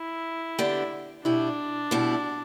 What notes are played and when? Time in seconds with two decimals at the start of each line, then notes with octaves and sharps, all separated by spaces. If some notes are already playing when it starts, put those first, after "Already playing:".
Already playing: E4
0.59 D3 B3 G4 D5
1.25 B2 G3 D4 E4
1.91 B2 G3 E4